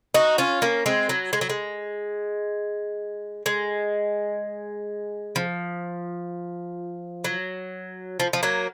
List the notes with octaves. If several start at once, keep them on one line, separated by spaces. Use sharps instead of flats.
D#4 F#4
C#4 F4
A#3 C#4
G#3 C4
F#3
G#3
F#3
G#3
G#3
F3
F#3
F3
F3
F#3 A#3